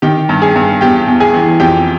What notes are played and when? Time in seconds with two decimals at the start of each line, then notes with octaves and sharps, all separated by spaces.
0.02 D#3 G4 G5
0.29 G2
0.42 G#4 G#5
0.55 G2
0.81 E2 G4 G5
1.07 E2
1.20 G#4 G#5
1.34 E3
1.60 F2 G4 G5